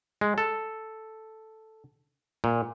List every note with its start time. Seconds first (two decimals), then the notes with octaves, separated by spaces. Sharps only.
0.21 G#3
0.38 A4
2.44 A#2